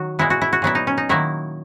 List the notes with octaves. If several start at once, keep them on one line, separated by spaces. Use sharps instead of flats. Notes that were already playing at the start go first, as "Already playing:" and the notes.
Already playing: D#3 F#3 F#4
A#2 G#3 B3 E4
F#4
E4
F#4
A#2 F#3 B3 E4
D#4
C#4
D#4
D#3 F#3 A#3 E4